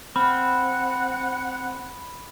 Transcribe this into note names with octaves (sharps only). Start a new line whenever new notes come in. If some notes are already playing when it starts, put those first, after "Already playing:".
C4 F#5 B5